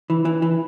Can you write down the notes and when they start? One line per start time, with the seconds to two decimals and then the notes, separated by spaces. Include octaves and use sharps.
0.10 E3
0.25 E3
0.42 E3